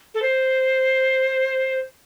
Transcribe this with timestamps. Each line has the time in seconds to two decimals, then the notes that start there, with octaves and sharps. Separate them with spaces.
0.14 A4
0.22 C5